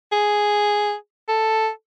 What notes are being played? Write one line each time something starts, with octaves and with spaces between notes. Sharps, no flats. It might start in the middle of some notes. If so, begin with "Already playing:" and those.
G#4
A4